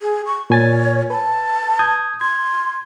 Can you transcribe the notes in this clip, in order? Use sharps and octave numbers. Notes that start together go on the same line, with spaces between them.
G#4
C#6
A#2 C#5 G#5 A6
B4 A5
D#6 G6 G#6
C6 G#6